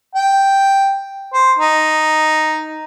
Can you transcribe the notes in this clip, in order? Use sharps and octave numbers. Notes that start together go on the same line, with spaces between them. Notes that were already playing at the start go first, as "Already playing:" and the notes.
G5
C5
D#4